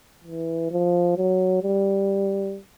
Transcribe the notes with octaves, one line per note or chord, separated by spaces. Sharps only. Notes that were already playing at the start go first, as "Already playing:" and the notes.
E3
F3
F#3
G3